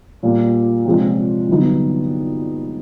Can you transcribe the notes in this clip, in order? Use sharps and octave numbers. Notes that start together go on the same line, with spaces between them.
A#2 G3 A#3
C3 F3 G#3 C#4
G2 D3 F#3 B3 D#4